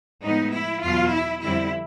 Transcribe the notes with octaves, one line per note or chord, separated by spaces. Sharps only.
A2 F3 G#3 B3 D#4
E4
E2 B2 F#3 F4
E4
F2 D3 G3 C4 E4